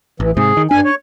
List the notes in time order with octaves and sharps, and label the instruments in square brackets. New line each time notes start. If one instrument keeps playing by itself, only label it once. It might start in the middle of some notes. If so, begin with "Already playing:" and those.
[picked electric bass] A1 [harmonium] E3
[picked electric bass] G#2 C3 [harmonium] G#4
[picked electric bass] D#3
[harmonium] G2 G#5 [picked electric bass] D4
[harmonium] C#5